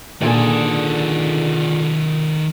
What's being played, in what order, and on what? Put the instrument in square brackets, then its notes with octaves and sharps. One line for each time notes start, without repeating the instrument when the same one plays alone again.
[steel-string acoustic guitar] A#2 D3 G#4 [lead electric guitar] D#3 A4